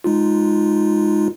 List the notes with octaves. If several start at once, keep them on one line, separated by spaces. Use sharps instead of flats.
G#3 D#4 F4